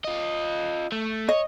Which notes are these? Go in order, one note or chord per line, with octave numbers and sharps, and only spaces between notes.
F4 D#5
A3
C#5 D#5